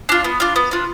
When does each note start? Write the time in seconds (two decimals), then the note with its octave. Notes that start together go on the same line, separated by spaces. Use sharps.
0.09 D4 F4
0.24 B3
0.40 D4 F4
0.56 B3
0.71 D4 F4